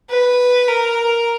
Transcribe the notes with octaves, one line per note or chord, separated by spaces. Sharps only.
B4
A#4